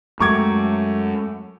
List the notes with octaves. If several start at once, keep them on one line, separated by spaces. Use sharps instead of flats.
F#2 G#3 A3 G5 A#5 C#6 D6 G#6